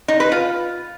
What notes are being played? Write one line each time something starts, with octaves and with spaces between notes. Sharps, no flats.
D#4
B4
F4